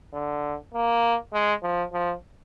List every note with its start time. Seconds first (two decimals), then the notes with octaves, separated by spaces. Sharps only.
0.14 D3
0.74 A#3
1.33 G#3
1.63 F3
1.93 F3